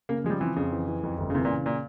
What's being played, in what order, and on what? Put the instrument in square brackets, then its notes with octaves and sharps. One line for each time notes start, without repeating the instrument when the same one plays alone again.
[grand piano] C#3 [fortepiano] A#3
[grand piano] F3 [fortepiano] G#3
[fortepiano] G3
[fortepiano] E3 [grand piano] C4
[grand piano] F2 [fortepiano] C#3
[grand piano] E3
E3
F2
G1
[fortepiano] C#3
[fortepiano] C3 [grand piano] E3
[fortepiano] A#2
[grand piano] C#3
[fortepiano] A#2